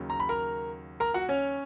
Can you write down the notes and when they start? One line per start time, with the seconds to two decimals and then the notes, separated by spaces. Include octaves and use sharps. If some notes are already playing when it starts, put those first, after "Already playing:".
Already playing: D#2 C#3 F#3
0.10 A#5
0.20 B5
0.29 A#4 A#5
1.00 A#4 A#5
1.14 F#4 F#5
1.29 C#4 C#5